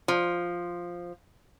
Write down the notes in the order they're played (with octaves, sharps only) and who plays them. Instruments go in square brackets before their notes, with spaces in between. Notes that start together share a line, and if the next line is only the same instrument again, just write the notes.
[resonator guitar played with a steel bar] F3